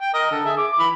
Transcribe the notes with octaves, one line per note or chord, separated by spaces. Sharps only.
G5
A#4 D#5
D3 A4
G#4 E5
D6
E3 B5